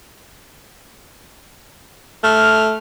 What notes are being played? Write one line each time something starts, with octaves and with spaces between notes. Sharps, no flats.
A3 F6